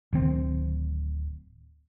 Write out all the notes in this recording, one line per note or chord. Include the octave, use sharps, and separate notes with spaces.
D1 D#3 C4